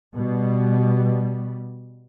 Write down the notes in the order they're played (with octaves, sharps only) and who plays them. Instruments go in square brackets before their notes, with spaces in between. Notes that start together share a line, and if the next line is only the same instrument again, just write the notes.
[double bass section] B2 G3